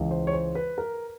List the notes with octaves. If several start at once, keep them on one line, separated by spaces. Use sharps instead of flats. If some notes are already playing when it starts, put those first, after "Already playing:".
Already playing: C#2 C#3 E3
C5
C#5
C5
B4
A#4